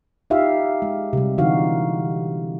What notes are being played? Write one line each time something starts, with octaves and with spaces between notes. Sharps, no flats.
D#4 F4 G4 E5 F5
G#3
C3 G3
D3 E3 D#4 F#4 F5